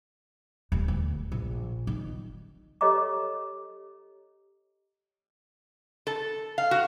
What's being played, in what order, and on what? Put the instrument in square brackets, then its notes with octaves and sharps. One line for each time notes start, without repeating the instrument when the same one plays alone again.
[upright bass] D#1
D2
A#1
D#3
[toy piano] G4 A4 C#5 D#5 A#5 D6
[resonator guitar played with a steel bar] A4
F5
F#4